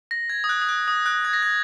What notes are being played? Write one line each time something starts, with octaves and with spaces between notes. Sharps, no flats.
A#6
G#6
D#6
F#6
D#6
F#6
D#6
F#6
G#6
A#6
G#6